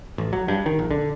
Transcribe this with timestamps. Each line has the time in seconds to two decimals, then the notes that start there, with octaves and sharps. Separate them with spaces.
0.18 A1
0.33 F#3
0.48 G2
0.66 D#3
0.79 A#1
0.91 D3